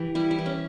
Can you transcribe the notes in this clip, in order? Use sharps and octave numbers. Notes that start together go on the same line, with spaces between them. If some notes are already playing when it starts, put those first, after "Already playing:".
Already playing: E3 G4
G3 E4
E4
E3
C#4